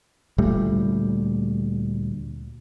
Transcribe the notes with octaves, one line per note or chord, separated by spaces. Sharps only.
D2 A#2 G3 A3